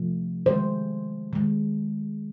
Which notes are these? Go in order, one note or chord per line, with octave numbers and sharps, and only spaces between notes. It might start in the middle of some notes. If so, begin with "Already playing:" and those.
Already playing: C3 F3 A3
D#3 G#3 C5
D#3 G#3